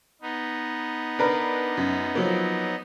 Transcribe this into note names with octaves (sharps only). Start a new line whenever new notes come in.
B3 D#4
D4 A#4 B4
F#2
F3 F#3 A#3